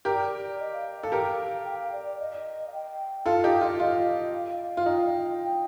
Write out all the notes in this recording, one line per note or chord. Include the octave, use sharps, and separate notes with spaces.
G4 A#4 D5
D#5
F5
A4 F5
G4 A#4
F5
G5
F5
D5
D5
D#5
F5
G5
F4 A4 F5
D#4 G4
F4
F4 D#5
F5
F5
F4
D#4 G5